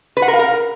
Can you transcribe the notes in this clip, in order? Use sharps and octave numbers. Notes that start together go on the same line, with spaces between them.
B4
F#5
A#4
F5
A#4